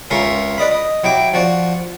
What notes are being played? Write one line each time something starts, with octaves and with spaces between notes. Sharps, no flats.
C#2 C#4 F4 A#4 E5 F5
B4 D5 D#5 B5
D#5
F#3 E4 G5 D6
F3 F#4 D5